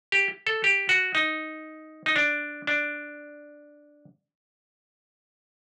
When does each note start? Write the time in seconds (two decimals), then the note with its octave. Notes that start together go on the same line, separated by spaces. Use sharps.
0.12 G4
0.47 A4
0.64 G4
0.89 F#4
1.15 D#4
2.06 D#4
2.16 D4
2.67 D4